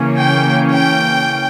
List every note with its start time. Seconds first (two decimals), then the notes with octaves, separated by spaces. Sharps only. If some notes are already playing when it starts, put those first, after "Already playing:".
Already playing: C#3 E3 A#3 C#4
0.18 G5
0.71 G5